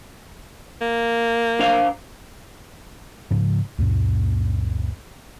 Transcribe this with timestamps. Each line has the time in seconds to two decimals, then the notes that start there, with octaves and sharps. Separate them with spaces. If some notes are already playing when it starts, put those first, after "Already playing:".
0.81 A#3
1.60 D4 C5 F5
3.31 G#2 C#3 F3
3.78 C#2 F#2 A#2